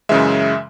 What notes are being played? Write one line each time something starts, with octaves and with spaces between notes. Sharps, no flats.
F#2 C#3 E3 G#3 E5